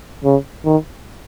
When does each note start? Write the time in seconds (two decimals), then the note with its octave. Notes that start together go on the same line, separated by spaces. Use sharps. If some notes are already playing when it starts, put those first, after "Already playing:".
0.24 C#3
0.65 D#3